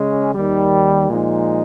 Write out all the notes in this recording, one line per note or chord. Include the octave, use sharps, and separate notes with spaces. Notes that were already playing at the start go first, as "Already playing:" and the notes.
Already playing: C#3 G#3 C#4
D#2 D#3 G3
A#2 F3 G#3 D#4